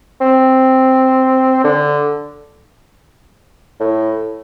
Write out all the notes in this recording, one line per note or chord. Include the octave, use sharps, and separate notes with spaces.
C4
D3
A2